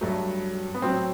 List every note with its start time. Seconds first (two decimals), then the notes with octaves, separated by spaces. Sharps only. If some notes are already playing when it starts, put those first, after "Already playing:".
0.01 G2 F#3 A3
0.74 B3
0.82 A2 F#3 C4